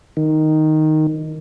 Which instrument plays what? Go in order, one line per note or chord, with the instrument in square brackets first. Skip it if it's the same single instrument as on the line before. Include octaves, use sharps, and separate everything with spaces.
[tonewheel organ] D#3